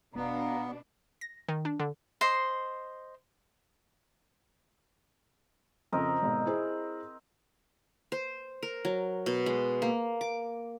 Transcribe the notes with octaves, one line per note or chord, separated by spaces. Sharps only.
F1 B2 B3 D4 F5 A#5
A#6
D#3
D4
D3
C5 D#5 C6
F2 C#3 C4 A#4 D#5
G#1 B2
E4 G#4 C5
C5
A#4
F#3
B2
G#3
A#3
D6